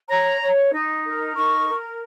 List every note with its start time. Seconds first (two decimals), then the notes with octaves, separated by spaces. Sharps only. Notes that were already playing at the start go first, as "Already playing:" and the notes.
0.09 C#5 A#5
0.41 C#5
0.72 D#4
1.04 A#4
1.36 D#4 C#6
1.69 A#4